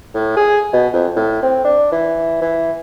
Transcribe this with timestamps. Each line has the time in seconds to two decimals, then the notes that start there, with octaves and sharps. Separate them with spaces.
0.15 A2
0.37 G#4
0.73 B2
0.93 F2
1.16 A2
1.42 C4
1.65 D4
1.92 E3
2.42 E3